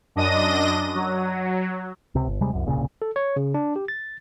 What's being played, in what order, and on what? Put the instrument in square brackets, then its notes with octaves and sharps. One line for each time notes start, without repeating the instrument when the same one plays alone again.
[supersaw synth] F#2 D4 D#5 A#6 D#7
F#3
[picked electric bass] C#2 C3
G1
D#2 C3 G3 G#3
C2 F#2
D#1 C2 A#2 C#3
[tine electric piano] A4
C#5
C#3
D4
G4
A6